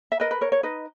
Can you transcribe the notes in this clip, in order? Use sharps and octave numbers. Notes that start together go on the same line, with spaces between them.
E5
A#4 B4 D#5
B4
A#4 C#5
C#5
D#4 B4 D#5